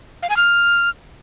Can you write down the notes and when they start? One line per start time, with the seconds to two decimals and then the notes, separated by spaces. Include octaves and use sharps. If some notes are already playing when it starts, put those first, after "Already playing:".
0.23 F5
0.30 G#5
0.37 F6